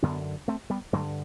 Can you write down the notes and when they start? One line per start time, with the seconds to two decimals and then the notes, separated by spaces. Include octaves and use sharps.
0.02 F#2 D3 B3 D4
0.48 A3 C4
0.70 G3 B3
0.93 G2 D3 F#3 A3